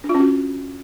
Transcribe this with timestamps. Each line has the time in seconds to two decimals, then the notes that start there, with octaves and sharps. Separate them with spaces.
0.04 D4
0.09 F4
0.15 C#4
0.20 F#4